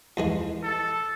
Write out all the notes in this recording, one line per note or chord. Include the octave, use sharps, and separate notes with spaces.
D#2 E3 G#3
A4